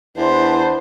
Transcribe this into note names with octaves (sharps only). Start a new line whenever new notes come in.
E2 B3 D4 E4 B4 C5 A5 C6